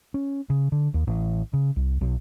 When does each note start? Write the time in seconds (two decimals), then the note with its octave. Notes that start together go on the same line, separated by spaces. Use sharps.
0.14 C#4
0.50 C#3
0.72 D3
0.94 D#2
1.07 A1
1.53 C#3
1.76 C2
2.01 B1